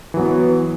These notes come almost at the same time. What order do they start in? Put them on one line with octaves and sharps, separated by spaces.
E3 F#3 B3